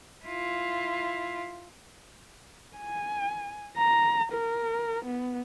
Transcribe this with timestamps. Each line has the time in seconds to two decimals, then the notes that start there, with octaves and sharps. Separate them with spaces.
0.24 E4 F4
2.77 G#5
3.78 A#5
4.33 A#4
5.06 B3